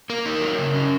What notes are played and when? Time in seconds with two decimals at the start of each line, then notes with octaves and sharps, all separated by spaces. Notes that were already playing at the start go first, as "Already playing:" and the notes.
0.10 A#3 A#4
0.26 D#4
0.42 F#3
0.58 C#3
0.74 C#4